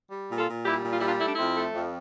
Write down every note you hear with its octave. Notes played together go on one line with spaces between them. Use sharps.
G3
A#2
F4 A4
A#2
G3 E4 G4
A#2
F4
G3 E4
D4 F4
A3 E4
D4
F2 C4 E4
A3
F2